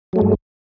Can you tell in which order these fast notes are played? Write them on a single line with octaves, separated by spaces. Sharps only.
F#3 A3 G#3 G2